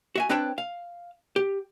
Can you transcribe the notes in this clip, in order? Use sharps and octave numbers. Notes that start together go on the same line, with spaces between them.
F#4 E5 G#5
C4 D4 B4 C#5 G5 A5
F5
G4